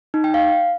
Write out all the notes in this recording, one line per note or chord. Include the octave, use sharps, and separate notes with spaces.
D#4
G5
F5